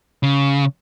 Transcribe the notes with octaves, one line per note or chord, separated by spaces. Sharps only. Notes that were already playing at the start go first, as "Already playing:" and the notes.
C#3